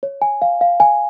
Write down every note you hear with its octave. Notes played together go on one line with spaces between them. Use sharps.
C#5
G#5
F5
F5
G#5